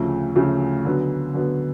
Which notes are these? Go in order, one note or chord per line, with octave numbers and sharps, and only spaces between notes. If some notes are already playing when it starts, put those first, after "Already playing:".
Already playing: D2 C#3 F3 A3
D2 C#3 F3 A3
D3 F#3 B3
D3 F#3 B3